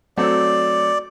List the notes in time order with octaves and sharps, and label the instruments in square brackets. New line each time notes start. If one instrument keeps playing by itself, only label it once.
[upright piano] F#3 A3 C4 [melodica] D5